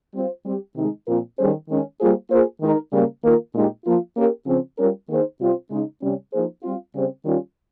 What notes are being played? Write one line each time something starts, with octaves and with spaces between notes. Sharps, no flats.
G3 C4 F4 C5
G3 C4 G4
C3 D#3 G#3 D#4
A#2 F3 C4 F4 A#4
D#3 G3 C#4 G#4 C5
D#3 G#3 C#4
G3 A#3 F4 G#4 C5
A#3 F4 G#4 C5
D#3 G#3 D#4 A#4
C#3 G3 A#3
D#3 A#3 F4 A#4
A#2 G#3 D#4 G4
F3 A#3 F4
A#3 C#4 G4 A#4
C#3 F3 C4
G3 C#4 F4 A#4
D#3 A#3 D#4 G#4 C5
C3 G3 C4 F4 C5
C#3 G#3 D#4
C3 G3 C#4
F3 A#3 D#4 G#4 C5
G3 C4 F4
C#3 G3 C4 G4 C5
D#3 G3 C#4 F4